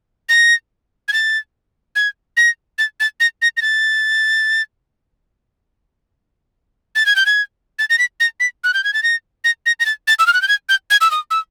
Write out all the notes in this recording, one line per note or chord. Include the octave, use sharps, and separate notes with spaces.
A#6
G#6
A6
G#6
A#6
A6
A6
A#6
A#6
A#6
A6
A6
G#6
G6
G#6
A6
A#6
B6
A#6
B6
F#6
G6
G#6
A6
A#6
A#6
A#6
A#6
A6
A6
E6
F6
F#6
G6
G#6
G6
G#6
E6
D#6
E6